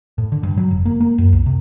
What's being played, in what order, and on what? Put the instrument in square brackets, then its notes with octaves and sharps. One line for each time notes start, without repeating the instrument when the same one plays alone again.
[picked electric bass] A2
D3
G2
F#3
F1
A#3
A#3
F#2
C2
C3